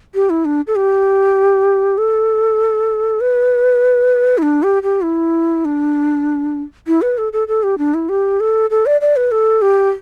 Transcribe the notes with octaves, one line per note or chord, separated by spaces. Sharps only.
G4
E4
D4
A4
G4
A4
B4
E4
D4
G4
G4
E4
D4
E4
B4
A4
A4
A4
G4
D4
E4
G4
A4
A4
D5
D5
B4
A4
G4